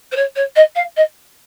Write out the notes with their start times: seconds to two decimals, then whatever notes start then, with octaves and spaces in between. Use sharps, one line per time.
0.11 C5
0.16 C#5
0.35 C#5
0.55 D#5
0.75 F5
0.96 D#5